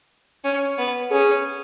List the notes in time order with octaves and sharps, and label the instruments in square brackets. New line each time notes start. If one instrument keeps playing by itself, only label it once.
[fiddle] C#4
B3
[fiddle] C#4 [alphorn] G#4